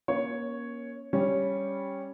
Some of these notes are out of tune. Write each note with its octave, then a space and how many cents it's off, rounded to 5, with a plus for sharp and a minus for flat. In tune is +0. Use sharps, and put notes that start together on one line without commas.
A#3 +30 C#4 +0 C#5 +0
G3 +0 C#4 -5